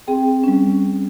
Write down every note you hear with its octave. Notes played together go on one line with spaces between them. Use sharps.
C4 G#4 G5
G3 C#4